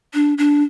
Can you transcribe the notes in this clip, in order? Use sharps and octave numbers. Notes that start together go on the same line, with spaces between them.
D4
D4